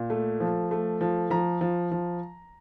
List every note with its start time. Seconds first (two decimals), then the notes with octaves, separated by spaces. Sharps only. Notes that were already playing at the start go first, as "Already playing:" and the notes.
Already playing: A#2
0.10 A3
0.40 F3
0.71 A3
1.01 F3
1.30 F3 A#5
1.61 F3
1.91 F3